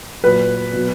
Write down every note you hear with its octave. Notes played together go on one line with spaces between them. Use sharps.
A#2 F#3 B4
B2 F#3